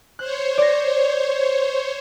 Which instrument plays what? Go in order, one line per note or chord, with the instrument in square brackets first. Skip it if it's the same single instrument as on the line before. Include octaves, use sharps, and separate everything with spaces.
[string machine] C5 C#5 [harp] F#6
[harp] D5 A#6